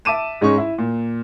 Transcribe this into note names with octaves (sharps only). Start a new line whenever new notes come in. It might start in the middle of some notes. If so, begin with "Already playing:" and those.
E5 A5 D6 D#7 E7
G#2 G#3 C#4 D#4 C#6
E4
A#2